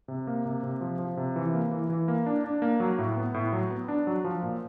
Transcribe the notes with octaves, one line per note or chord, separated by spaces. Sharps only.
C3
A#3
C3
C3
F3
F3
C3
E3
A#3
E3
E3
A#3
D4
D4
A#3
F#3
A2
B3
A2
F#3
B3
D4
F#3
F3
A#2